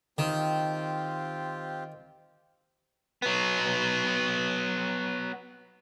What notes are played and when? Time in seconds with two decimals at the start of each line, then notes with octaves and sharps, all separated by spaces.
0.18 D#3 C4 F4 G4
3.22 F#3 B3